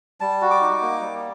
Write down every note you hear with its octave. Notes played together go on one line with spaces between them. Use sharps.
G3 A5
F#4
D6
D#4
A#3
G3